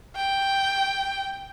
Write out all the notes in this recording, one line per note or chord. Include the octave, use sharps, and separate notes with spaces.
G5